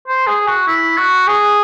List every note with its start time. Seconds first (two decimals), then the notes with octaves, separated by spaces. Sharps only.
0.08 C5
0.27 G#4
0.47 F#4
0.68 E4
0.97 F#4
1.27 G#4